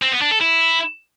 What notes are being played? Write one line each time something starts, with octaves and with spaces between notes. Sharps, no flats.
C4
B3
D4
A4
E4